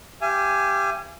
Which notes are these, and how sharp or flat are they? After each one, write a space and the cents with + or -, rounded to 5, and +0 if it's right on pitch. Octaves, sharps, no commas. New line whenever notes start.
G4 +0 F5 -45 G#5 +0